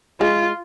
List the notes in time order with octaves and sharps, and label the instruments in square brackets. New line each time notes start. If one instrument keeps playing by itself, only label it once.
[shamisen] G#3 [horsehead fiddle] F4